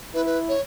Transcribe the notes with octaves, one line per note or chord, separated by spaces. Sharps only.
E4 B4
B4
C#5